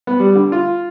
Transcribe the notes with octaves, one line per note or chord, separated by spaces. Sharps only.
B3
G3
D3
F4